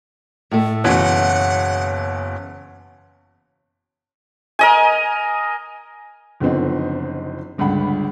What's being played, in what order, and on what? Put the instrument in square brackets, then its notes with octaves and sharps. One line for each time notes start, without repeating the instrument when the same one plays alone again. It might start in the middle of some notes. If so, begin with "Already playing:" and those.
[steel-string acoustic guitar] A2 A3
[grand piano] F#1 B2 E3 [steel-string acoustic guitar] C#4 [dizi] F#5
[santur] A#4 D#5 G#5
[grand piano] F#1 D3 F3 B3 C4 D#4
G1 C#2 G2 F#5 B5